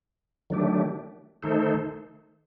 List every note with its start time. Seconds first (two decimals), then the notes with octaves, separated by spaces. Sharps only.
0.50 D#3 F#3 A3 D4 G4
1.43 D#3 A3 D#4 A4 C5